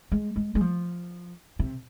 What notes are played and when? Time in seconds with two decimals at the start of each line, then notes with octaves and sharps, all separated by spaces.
0.12 G#3
0.36 G#3
0.55 G#3
0.61 F3
1.59 C3